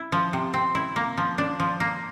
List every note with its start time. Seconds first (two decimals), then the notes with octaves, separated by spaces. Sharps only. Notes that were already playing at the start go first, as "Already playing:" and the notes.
Already playing: E4
0.12 F3
0.33 C3
0.54 C4
0.75 E4
0.96 A#3
1.18 F3
1.38 D4
1.60 F3
1.80 A#3